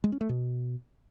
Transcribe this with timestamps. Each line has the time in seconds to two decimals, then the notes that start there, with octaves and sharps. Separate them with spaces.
0.04 G#3
0.12 C#4
0.21 A3
0.29 B2